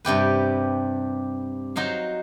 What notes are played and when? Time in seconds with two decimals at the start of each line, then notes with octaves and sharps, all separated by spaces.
0.05 G2 C3 G4 B4
1.76 F#3 D#4 C5 F5